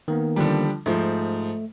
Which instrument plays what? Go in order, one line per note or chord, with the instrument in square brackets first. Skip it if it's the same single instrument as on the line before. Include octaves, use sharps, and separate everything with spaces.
[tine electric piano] D#3 A#3 B3
[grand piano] D3 F3 G3
[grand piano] G#2 F3 [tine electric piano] A3